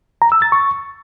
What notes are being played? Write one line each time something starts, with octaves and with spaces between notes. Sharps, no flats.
A#5
E6
A6
C#6